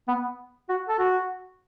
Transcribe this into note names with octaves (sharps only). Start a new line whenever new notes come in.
B3
F#4
A4
F#4